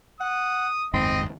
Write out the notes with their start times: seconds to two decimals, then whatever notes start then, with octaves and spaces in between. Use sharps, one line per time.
0.21 F#5 D#6
0.93 F#1 D#2 G#2 C4 D#5